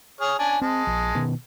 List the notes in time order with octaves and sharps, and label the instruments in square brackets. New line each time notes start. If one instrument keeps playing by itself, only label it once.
[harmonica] G#4 C#5 F6
C#4 D4 G#5
[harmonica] G#3 A5 [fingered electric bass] C4
[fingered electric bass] A#1
B2 D#3 B3